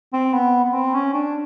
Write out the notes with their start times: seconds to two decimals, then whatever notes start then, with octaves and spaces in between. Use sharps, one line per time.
0.13 C4
0.33 B3
0.65 B3
0.73 C4
0.94 C#4
1.14 D4